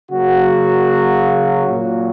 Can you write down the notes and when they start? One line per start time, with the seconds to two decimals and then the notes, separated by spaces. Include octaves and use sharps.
0.11 C#3 F#3 A#3 F#4
1.67 A#2 F#3 A#3